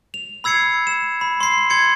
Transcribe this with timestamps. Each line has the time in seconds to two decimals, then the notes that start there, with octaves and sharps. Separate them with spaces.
0.14 F7
0.44 B5 E6 G#6 C7 C#7
0.87 E7
1.21 B5
1.41 C6 C7
1.70 C6 G#6 C#7